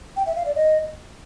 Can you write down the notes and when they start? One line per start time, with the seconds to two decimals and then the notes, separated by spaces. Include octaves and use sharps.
0.16 G5
0.26 E5
0.36 F5
0.46 D5
0.55 D#5